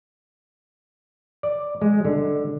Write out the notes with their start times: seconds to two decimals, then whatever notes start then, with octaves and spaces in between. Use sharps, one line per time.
1.43 D5
1.82 G#3
2.05 D3